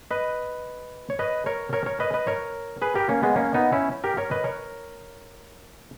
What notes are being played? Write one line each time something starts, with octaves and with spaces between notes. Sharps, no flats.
B4 D#5
C#5
B4 D#5
A#4 C#5
A#4 C#5
A#4 C#5
B4 D#5
B4 D#5
A#4 C#5
G#4 B4
G4 A#4
A#3 C#4
G#3 B3
A#3 C#4
B3 D#4
C#4 E4
G4 A#4
A#4 C#5
B4 D#5
A#4 C#5